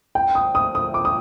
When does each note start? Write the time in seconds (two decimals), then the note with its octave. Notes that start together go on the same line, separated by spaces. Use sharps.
0.15 G5
0.35 D#6
0.55 D#6
0.75 D#6
0.94 D6
1.05 D#6